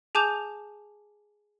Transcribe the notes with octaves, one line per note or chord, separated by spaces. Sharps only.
G#4 G#5 A5 D6 G6 F7